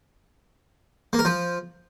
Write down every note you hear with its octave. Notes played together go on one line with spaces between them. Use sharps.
A#3
A#4
F3